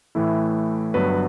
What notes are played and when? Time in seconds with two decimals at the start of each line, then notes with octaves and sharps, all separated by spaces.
0.15 A2 E3 A3 E4
0.94 G1 G2 F#3 B3 B4